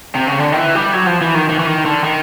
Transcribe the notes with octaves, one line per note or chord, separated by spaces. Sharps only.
C3
C#3
D3
D#3
E3
G3
F#3
F3
E3
D#3
D#3
E3
D#3
D3
D#3